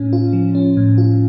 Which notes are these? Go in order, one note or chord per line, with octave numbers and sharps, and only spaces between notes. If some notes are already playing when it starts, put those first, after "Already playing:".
Already playing: A2 C#4
F4
F3
C#4
A2
F4